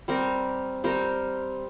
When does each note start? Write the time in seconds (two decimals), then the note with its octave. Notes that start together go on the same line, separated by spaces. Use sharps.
0.08 G3 C4 G4 A#4
0.84 G3 C4 G4 A#4